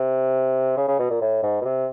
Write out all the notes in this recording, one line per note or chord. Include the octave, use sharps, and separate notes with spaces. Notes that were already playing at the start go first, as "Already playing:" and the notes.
Already playing: C3
C#3
C#3
B2
A#2
A2
G#2
B2
C3